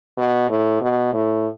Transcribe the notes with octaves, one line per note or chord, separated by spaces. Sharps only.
B2
A2
B2
A2